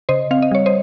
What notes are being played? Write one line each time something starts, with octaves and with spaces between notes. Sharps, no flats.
C#3 C5 D#5
C4 F5
D#5
G3 C#5
C5 D#5